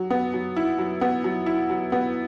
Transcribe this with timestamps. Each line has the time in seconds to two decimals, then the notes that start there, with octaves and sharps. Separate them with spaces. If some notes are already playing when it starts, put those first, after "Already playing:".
Already playing: F#3
0.11 B3
0.34 F#3
0.56 E4
0.78 F#3
1.01 B3
1.24 F#3
1.46 E4
1.70 F#3
1.92 B3